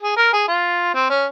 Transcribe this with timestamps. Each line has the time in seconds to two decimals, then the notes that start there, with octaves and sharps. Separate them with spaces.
0.03 G#4
0.17 A#4
0.33 G#4
0.48 F4
0.94 C4
1.10 C#4